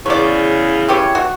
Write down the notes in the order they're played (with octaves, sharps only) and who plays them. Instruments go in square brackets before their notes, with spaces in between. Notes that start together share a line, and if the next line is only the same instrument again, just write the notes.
[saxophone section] E2 C#3 [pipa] C#5 D5
[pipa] E3 G4 C#5
F#4